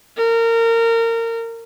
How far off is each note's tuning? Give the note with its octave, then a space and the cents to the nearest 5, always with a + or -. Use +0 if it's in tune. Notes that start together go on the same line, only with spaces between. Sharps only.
A#4 -25